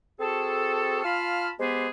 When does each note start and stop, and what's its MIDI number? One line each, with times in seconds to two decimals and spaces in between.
0.20 1.01 60
0.20 1.01 66
0.20 1.01 68
0.20 1.01 69
1.04 1.50 65
1.04 1.50 77
1.04 1.50 81
1.04 1.50 83
1.04 1.50 89
1.59 1.88 56
1.59 1.88 59
1.59 1.88 67
1.59 1.88 68
1.59 1.88 71
1.59 1.88 72